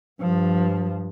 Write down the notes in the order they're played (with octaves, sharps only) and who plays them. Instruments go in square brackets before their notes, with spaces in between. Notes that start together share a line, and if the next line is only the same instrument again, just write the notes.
[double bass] G2 F3